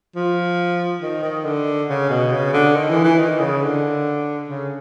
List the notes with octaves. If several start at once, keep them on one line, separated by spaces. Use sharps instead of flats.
F3
D#3
D#3
D3
C#3
B2
C#3
D3
D#3
E3
E3
D#3
C#3
D3
C#3